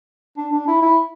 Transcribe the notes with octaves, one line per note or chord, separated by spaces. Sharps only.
D4
D4
E4
E4